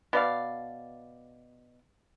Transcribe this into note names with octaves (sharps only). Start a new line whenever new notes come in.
B2 D5 F5